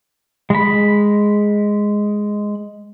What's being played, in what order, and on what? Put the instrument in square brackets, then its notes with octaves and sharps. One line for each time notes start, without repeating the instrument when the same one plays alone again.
[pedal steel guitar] G#3 B5